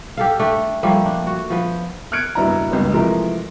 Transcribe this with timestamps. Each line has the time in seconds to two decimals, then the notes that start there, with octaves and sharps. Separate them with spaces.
0.17 G4 A4 F5
0.39 A3 D4 G4
0.83 F3 G3 A3 A#3
1.06 D4
1.27 F#4
1.50 F3 B3
2.12 F6 F#6 G#6 C#7 D7
2.35 F#1 G2 B2 E4 D5 A#5
2.72 F#1 C#2 G2
2.93 C3 E3 F3 G#3 A3 A#4